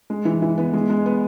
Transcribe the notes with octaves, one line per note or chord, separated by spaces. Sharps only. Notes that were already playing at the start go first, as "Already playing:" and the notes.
G#3
E3
E3
B3
G#3
G#3
B3